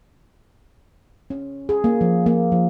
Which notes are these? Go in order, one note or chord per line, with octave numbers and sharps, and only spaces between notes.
C#4
G#4
A#3
F3
A#3
F3